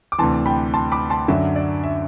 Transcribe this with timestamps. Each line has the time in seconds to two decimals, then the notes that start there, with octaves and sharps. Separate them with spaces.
0.12 D6
0.18 D2 C3 E3 A5 C6
0.46 G5 B5
0.74 A5 C6
0.92 B5 D6
1.10 A5 C6
1.28 F#2 D3 F#3 E5
1.56 D5
1.84 E5